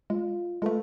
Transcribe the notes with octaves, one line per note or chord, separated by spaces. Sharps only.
G#3 F4
G#3 A3 F4 A4 B4